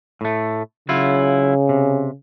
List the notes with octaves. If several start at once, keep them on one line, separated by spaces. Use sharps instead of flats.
A2 A3
C#3 F#3 E4 F4
C3